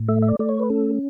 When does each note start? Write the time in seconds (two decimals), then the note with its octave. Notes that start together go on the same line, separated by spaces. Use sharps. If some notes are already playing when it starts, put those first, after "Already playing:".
Already playing: A2
0.08 A3 E5
0.22 E5
0.28 D5
0.39 A3 D5
0.49 C#5
0.59 B4
0.70 C#4 A4